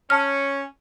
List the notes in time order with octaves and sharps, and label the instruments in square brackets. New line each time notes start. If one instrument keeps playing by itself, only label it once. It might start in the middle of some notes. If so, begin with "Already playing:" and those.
[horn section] C#4 [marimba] A5 F6